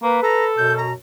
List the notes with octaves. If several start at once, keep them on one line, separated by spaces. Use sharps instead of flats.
A#3 B4
A4 A#5
F#2 B2 G6
A#5